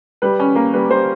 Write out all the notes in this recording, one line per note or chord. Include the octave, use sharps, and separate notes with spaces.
G3 B4
C#4
A#3
G3 B4
G3 C5